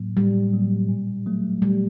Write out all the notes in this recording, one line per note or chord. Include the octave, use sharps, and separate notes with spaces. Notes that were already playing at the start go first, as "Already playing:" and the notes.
Already playing: A2 F#3 A#3
A2 G3
F#3 A#3
A#2
F#3 A3
A#2 G3